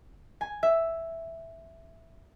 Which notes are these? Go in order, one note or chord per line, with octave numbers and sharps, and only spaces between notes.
G#5
E5